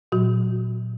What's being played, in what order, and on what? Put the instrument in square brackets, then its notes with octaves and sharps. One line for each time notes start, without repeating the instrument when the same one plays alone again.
[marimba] A#2 F#3 F#4